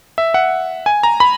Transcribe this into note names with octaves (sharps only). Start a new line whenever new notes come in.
E5
F#5
G#5
A#5
B5